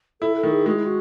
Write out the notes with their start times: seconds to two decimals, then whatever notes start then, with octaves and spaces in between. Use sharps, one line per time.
0.21 E4 A4
0.37 A4
0.43 D#3
0.52 G#4
0.66 G#3 F#4
0.75 E4
0.86 F#4